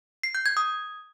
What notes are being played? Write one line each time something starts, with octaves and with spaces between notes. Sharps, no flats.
C7
G6
G#6
D#6